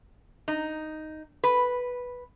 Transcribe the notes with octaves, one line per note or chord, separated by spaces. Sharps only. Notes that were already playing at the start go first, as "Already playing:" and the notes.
D#4
B4